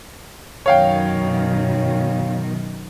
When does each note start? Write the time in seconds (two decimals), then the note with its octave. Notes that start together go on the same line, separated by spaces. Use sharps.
0.66 F#2 B2 D#3 C#5 F5 G5